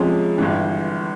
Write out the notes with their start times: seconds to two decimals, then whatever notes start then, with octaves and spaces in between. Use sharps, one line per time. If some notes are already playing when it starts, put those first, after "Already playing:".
Already playing: F2 C3 F3 G#3 C#4
0.38 G1 G2 E3